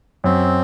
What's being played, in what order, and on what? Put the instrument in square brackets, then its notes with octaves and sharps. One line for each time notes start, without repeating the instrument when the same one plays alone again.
[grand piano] F#2 [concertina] C4